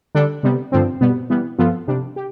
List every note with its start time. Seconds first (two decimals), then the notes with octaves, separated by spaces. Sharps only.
0.15 D3 G3 D4 A4
0.43 C3 G3 B3
0.72 G2 D3 F3 C4
1.01 B2 G3 B3
1.30 E3 G3 B3
1.59 G2 F3 B3 F4 A4
1.88 C3 G3 D4
2.16 G4